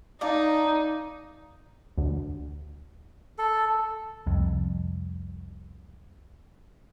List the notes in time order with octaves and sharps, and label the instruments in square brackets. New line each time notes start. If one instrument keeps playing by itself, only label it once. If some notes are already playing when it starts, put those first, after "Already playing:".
[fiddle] D#4 [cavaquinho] D5 F5 A5
[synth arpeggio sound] D2
[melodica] A4
[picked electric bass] C2 F2